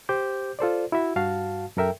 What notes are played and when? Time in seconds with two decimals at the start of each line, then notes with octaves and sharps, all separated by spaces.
0.09 G4 C5 D6 G6
0.59 F4 A4 C5 D5
0.92 E4 F#4 E5
1.16 G2 F#4 F5 A5
1.77 F#2 A4 A#4 E5 G5